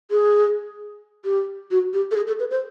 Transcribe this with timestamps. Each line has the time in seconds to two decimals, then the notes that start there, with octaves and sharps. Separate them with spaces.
0.11 G#4
1.25 G4
1.71 F#4
1.94 G4
2.11 A4
2.16 G#4
2.27 A4
2.40 B4
2.51 C5